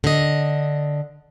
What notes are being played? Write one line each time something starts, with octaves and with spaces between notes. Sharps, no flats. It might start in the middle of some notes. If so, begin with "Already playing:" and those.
D3 D#5